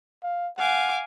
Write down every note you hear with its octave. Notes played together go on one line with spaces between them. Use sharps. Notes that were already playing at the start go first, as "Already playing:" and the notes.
F5
F5 F#5 G#5 D6